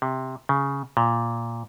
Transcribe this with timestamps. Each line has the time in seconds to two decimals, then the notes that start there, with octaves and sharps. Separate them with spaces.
0.02 C3
0.49 C#3
0.97 A#2